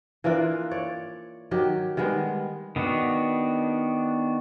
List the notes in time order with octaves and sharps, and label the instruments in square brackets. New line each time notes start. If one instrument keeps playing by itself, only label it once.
[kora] E3 A#3 D4 F4
C#5 D5
D#3 F#3 G4
D#3 G3 G#3 B3
[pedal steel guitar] D#3 B3 D4 F#4